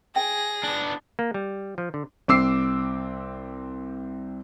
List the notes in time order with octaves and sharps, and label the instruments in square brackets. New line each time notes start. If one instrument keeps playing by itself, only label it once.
[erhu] G#4 [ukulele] G5 [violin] A#6
[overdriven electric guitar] B3 D4
[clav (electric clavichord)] A#3
G3
F3
D3
[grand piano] C2 C4 D6 E6 C7